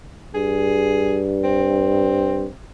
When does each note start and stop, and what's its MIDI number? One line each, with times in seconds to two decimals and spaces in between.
0.34 2.47 43
0.34 1.23 68
1.44 2.54 60